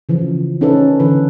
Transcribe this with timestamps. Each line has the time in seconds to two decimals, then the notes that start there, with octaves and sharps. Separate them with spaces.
0.09 C#3 E3 F3
0.61 C#4 D#4 A4 B4
1.00 D3 E3 B4